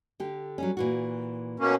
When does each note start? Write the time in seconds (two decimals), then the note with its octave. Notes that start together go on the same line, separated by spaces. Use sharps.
0.20 D3 G4
0.58 F#3 G3 C#4
0.77 A#2 E3 F#4
1.60 B2 A#3 C#4